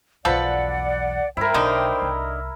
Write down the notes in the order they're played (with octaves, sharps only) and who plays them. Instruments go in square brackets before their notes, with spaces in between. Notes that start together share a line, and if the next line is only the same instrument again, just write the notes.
[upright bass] B1 E2 [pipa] F3 A4 B4 [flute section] D5 F#5
[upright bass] G2 [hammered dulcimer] E4 A#4 [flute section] C5 G5
[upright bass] B1 [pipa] D3 D4 D#4
[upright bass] C2